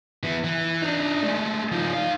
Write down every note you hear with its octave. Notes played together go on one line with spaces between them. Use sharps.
E3 B3
E3
D4 D#4
G#3 A3
F3 D#4
D#4 F5